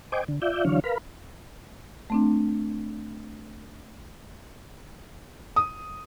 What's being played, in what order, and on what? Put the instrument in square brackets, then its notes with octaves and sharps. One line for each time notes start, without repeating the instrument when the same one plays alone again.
[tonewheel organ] C5 D#5 G5 G#5 D6
D3
F4 D5 E5 G6
D3 E3 F#3 D4 C#5 F5
A#4 B4 F5 B5
[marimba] A3 C4 D4
[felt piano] D#6